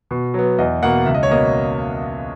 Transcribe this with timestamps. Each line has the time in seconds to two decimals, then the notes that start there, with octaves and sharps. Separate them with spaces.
0.11 B2
0.34 F#3 B3
0.58 E2 D#5
0.83 B2 A#3 F#5
1.06 C#2 E5
1.14 D#5
1.23 C#5
1.30 B2 A#3 D#5